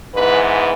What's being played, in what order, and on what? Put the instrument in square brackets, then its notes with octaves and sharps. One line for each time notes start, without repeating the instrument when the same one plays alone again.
[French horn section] G#2 E3 B3 B4